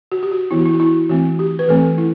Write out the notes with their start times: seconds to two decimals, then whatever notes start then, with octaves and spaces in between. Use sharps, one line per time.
0.12 F#4
0.23 G4
0.31 F#4
0.51 E3 B3 E4
0.59 F#4
0.66 E4
0.73 F#4
0.80 E4
1.09 E3 A3 C4 F#4
1.39 G4
1.59 B4
1.68 E3 A3 C4 A4
1.98 E4